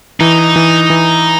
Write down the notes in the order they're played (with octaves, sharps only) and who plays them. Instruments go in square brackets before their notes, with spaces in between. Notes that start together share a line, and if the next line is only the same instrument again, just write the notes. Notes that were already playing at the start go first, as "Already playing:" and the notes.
[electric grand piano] E3 [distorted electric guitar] D#4
[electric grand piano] E3
E3